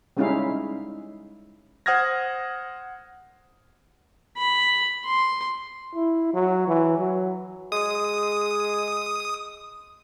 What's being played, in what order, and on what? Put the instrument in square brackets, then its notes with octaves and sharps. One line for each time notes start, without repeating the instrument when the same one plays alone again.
[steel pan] G3 G#3 C#4 D#4 E4 F5
[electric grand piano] C5 F#5 D#6 F6 G#6 A#6
[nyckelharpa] B5
C6
[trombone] E4
F#3
E3
F#3
[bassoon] G#3 [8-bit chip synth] D#6